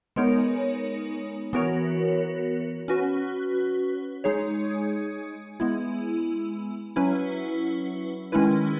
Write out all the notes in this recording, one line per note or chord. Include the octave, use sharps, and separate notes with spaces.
G#3 B3 D#4 A#4 C#5
E3 B3 F#4 A#4 C#5
C#4 F#4 B4
G#3 D#4 G#4 C#5
G#3 B3 E4
F#3 C#4 E4 B4
D#3 G#3 C#4 E4 B4